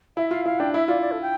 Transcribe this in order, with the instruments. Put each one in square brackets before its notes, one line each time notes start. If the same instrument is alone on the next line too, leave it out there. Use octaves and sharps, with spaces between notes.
[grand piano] E4 [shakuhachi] E5
[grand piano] F4 [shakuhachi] F5
[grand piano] E4 [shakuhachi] F5
[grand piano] D4 [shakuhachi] G5
[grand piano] E4 [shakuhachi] E5
[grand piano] F4 [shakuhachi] D5
[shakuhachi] D5
A4
G5